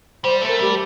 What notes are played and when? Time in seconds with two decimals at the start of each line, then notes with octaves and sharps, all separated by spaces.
0.24 G3 C5
0.42 A3
0.48 A#4
0.59 G3 G4